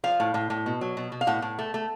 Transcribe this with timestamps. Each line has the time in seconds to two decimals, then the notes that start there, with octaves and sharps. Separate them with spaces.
0.04 F3 F5
0.20 A2
0.34 A2
0.50 A2
0.66 B2
0.81 F#3
0.97 B2
1.12 B2
1.21 F5
1.27 A2 F#5
1.42 A2
1.59 A3
1.74 A3